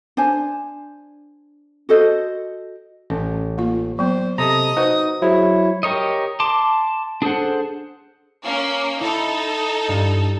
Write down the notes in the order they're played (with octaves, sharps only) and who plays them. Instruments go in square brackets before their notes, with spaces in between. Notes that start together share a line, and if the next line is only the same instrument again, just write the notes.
[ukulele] D4 C5 G#5
F#4 A4 C5 D#5
[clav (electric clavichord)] A1 [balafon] C#4
[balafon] A#3 F4
[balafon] F#3 B3 [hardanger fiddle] C5
[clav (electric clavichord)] C3 A4 [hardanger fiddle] D#5 D#6 [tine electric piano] A#5
[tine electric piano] D#4 [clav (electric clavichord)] F#4 [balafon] B4 C5
[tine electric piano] F#3 E4 [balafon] G#4 C5 [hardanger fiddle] C#5
[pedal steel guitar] G4 A#4 C#5 D#5
A5 C6 D6
D4 G#4 A4 C5 F#5
[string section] A#3 C#4
[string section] D#4 A4 [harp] E4
[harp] G2